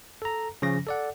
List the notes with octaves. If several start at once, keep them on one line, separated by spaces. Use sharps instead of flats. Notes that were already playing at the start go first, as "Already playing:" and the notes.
A4 A#5
C#3 F3 C#4 A#6
A4 D5 F#5